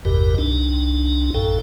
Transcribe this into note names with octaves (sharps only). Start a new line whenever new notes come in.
G#1 E2 G2 B2 G4 A#4
C2 D4 D#4
A#1 F#2 A2 A4 G5